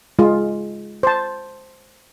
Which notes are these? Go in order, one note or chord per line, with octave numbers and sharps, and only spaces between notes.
G#3 F4
C5 A5